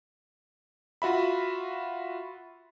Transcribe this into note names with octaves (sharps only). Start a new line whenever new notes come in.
F4 F#4 E5 B5